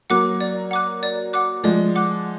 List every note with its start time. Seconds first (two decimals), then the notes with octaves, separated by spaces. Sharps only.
0.10 F#3 A#3 F#5 D6 F#6
0.40 D5
0.71 F#5 D6 F#6
1.03 D5
1.33 F#5 D6 F#6
1.63 F3 G#3 D5
1.95 F#5 D6 F#6